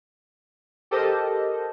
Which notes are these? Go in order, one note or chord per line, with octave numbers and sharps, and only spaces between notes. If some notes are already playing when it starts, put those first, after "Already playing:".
G4 A4 A#4 C5 D#5 A5